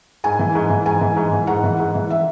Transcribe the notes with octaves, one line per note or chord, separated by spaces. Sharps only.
G#2 G#5
E3
G#2
E3
G#2 G#5
E3
G#2
E3
G#2 F#5
E3
G#2
E3
E5